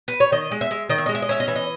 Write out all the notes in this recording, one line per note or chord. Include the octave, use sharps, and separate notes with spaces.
B4
C#5
D#3 D#5
G#3
E5
G#3
D#3 D#5
E5
G#3 D#5
E5
D#5
C#4 E5
D#5
E3 E5
D#5